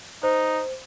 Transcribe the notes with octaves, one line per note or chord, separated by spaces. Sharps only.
D#4 C5